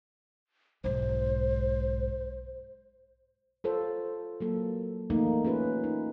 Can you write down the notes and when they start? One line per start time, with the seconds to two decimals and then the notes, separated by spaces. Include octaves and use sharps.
0.84 B1 G#2 C5
3.64 F4 A4 C5
4.40 F#3 A#3 A4
5.10 D#3 E3 A3 A#3 D#4
5.44 C#4 F4 G#4 B4
5.84 D#4